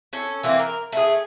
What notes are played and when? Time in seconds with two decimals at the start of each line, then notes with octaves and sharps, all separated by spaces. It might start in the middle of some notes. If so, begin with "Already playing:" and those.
0.13 C#4 A4
0.43 E3 A#3 C4
0.59 A#4
0.92 A3 G#4